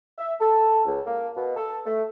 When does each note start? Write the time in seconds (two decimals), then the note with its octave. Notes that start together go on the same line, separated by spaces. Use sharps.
0.18 E5
0.41 A4
0.86 C#2
1.06 A#3
1.36 B2
1.56 A4
1.86 A3